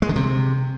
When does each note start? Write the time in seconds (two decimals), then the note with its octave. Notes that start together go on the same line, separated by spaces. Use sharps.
0.02 G#3
0.09 D3
0.16 C3